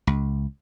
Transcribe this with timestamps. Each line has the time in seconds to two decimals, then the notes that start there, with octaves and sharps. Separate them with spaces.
0.07 C#2